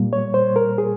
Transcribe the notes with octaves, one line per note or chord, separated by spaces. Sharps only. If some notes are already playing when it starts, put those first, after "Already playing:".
Already playing: A#2 G3 A#3
C#5
C5
A#4
G#4